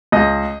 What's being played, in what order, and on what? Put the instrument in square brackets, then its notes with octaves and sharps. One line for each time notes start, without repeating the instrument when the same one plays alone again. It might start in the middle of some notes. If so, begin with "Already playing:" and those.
[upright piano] C#2 D#5